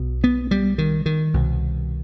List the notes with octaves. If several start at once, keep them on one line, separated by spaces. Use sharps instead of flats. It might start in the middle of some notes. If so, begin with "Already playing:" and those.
Already playing: B1 B2
B3
G3
D#3
D#3
C2 B2